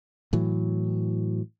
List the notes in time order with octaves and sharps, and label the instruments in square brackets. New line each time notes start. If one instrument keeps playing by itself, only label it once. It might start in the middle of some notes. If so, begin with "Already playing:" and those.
[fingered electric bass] A2 E3 F#3